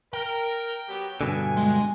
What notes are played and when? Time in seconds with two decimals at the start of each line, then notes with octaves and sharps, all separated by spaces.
0.14 A#4 G5
0.89 F#3 B3 G4
1.21 G2 B2 D3 G#5
1.57 G#3